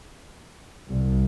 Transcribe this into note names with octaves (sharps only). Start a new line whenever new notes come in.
C2